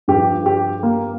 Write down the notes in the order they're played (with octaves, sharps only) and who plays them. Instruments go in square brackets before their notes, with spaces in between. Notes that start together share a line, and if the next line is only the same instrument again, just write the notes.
[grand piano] G2 F3 G4
G4
A#3